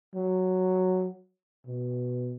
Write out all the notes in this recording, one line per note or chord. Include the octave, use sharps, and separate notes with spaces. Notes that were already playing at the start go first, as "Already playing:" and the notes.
F#3
B2